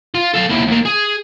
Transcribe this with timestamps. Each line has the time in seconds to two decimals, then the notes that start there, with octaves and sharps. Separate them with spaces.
0.15 F4
0.34 A4 F5
0.49 D#2 E4
0.68 D#2 A#3
0.85 G#4